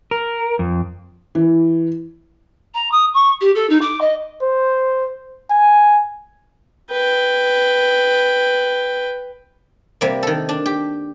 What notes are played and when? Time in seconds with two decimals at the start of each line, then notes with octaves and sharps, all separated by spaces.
0.11 A#4
0.59 F2
1.35 E3
2.74 A#5
2.91 D#6
3.14 C#6
3.41 G4
3.55 A4
3.69 D#4
3.81 D6
4.01 D#5
4.42 C5
5.50 G#5
6.91 B4 G5
10.01 C3 G3 A#3
10.23 D#3 A4
10.49 D4
10.66 G4